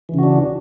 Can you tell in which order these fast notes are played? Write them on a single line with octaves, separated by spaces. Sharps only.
E3 C#3 F#4 D4